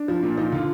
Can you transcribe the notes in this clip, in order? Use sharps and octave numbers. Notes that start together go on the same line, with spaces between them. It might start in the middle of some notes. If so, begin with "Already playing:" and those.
Already playing: D4
F3
A#2
F3 D#4
D3 F4